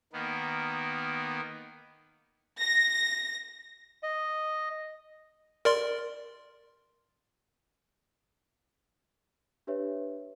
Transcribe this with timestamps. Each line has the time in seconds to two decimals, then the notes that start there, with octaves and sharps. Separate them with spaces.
0.13 D#3 A#3 B3
2.60 A#6
4.03 D#5
5.65 A#4 D5 C6
9.67 D4 G4 B4 C#5 E5